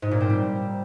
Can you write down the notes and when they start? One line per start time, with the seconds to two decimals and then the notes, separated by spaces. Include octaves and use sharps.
0.02 G#2
0.11 A#2
0.20 C4
0.30 G3